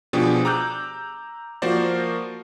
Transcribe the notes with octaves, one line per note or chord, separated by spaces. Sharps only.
B2 F3 D4 G4 G#4
A#5 D6 E6 F#6 G6
F3 A#3 F#4 A#4 C5 D5